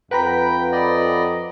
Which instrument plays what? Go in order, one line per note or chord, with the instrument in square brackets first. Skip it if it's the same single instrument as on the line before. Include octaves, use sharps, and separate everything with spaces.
[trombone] F2 [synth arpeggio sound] B4 [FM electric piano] F#5 A#5 B5 [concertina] G5
[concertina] D5 D#5